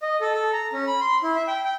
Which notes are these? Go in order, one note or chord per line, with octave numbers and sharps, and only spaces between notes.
D#5
A4
A4
A#5
C#4
B5
C6
E4
E5
G5
G5